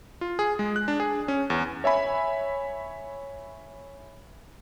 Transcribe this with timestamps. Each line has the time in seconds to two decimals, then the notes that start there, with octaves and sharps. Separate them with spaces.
0.21 F4
0.39 G#4
0.59 G#3
0.76 F#6
0.88 D4
1.00 G#4
1.28 C#4
1.50 E2
1.84 C#5 E5 G#5 B5